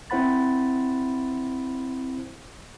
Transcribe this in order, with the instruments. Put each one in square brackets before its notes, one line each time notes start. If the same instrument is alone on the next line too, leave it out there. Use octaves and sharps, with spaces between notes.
[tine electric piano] C4 E4 C5 F#5 B5 A6